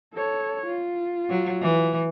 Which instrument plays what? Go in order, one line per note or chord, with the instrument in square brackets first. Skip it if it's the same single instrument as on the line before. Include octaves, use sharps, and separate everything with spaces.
[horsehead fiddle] A4 C#5
F4
[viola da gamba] F#3
E3